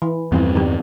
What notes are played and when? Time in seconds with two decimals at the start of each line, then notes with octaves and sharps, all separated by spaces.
0.02 E3
0.32 E2 G2 E3 F3 C4
0.55 D#3 G3